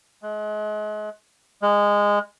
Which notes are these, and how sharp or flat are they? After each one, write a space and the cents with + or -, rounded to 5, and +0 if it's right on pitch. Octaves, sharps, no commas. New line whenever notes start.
G#3 +35
G#3 -15